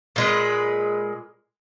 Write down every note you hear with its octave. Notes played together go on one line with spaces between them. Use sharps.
A#2 G#3 B4